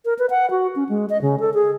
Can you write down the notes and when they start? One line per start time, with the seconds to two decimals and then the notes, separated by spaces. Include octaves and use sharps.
0.05 A#4
0.19 B4
0.30 F#5
0.51 F#4
0.76 C#4
0.89 G#3
1.10 D#5
1.22 C#3
1.40 A4
1.54 G#4